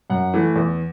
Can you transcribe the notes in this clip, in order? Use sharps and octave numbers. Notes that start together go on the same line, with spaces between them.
F#2 F#5
E3 A3
E2